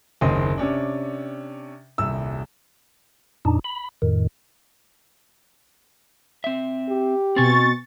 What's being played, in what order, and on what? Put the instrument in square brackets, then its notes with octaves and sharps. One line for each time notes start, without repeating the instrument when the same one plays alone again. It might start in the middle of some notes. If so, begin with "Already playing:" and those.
[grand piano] F#1 D#2 C4 D#5 C6
C3 C#4 D4
D#1 C2 E6
[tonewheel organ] F2 A#2 D4 D#4
B5
F2 A2 D#3
[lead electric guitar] C4 E5
[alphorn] G4
[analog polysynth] B2 C#6 A6 [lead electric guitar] C4 G#5